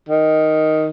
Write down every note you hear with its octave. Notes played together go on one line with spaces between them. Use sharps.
D#3